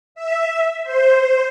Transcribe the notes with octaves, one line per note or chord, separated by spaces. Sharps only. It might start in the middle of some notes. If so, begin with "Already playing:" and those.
E5
C5